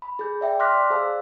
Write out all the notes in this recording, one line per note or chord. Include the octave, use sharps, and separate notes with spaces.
B5
G#4 G6
D5 E5 G5
C6 D6 F6 F#6 A#6 B6
D5
G#4 C5 F5 A5 E6